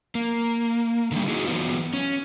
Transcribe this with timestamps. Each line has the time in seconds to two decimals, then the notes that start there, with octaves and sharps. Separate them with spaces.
0.15 A#3
1.12 D3 D#3 F3 G3
1.28 D#4 E4 F#4 G#4
1.47 E3 F#3 B3 F4
1.93 C#4